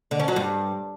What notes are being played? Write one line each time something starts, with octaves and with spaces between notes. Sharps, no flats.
D3
C#4
F#3
G2